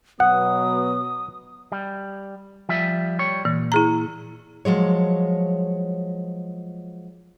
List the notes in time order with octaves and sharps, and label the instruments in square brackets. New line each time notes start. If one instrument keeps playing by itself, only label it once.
[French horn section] B2 F#3 B3 [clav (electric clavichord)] F#5 [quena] D#6
[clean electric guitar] G3
F3 G3 E5
G3 C#5
[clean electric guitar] A#2 [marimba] E3
[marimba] E4 G#4 A#5
[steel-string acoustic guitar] F3 F#3 G#3 C#5